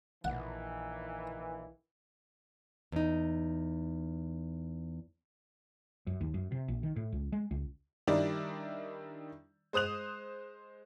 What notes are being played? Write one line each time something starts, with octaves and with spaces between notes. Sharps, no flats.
A#1 D#3 E3 F#5
E2 D#4
F#2
D#2
F#2
C3
A#1
D#3
A2
C#2
G#3
C#2
D#3 G3 D4 E4 A#4 D5
G#3 C5 D#6 F#6 F7